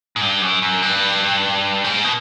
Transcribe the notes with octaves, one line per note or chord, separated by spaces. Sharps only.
G#2
G2
F#2
F#2
G2
G#2
B2